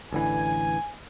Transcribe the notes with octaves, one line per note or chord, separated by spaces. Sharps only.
A1 D3 E3 G#5